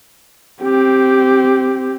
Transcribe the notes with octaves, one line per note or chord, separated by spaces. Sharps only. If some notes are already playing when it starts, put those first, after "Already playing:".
C4 G4